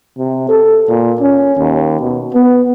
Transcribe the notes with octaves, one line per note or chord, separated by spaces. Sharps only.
C3
A4
A#2
C#4
D#2
B2
B3